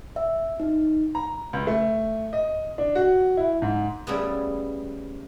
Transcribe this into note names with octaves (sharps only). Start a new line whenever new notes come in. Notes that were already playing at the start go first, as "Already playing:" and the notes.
E5
D#4
A#5
C#2
A3
D#5
D4
F#4
E4
G#2
C#3 G3 A3 B3